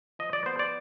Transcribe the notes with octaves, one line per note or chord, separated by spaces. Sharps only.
F3 D#5
D5
B3 C5
D5